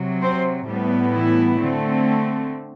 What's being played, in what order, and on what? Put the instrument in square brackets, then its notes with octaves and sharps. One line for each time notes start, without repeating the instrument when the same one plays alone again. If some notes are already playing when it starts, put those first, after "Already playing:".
Already playing: [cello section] C3 F#3
C4 C5
A2 G3 B3
E3 E4
D3 A3 C4